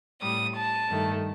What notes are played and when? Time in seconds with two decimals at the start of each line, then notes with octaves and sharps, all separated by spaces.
0.21 A2 G3 D#6
0.55 A5
0.89 G2 D#3 A3